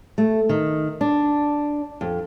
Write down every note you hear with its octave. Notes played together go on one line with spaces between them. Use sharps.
A3
D#3
D4
F2